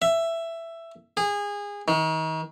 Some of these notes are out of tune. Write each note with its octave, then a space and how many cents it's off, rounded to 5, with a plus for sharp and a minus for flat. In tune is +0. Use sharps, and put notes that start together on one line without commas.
E5 +10
G#4 -25
D#3 +35